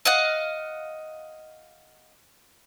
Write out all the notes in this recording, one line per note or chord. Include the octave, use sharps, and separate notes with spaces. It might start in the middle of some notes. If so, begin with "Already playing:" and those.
D#5 F5 F#5